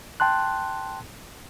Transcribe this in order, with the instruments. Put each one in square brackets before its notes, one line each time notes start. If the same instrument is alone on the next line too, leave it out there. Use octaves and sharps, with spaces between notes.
[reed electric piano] G5 A5 C6 F#6